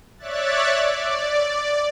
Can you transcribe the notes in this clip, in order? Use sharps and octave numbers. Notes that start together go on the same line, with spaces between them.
C#5 D5 E5 F#6 A6
D5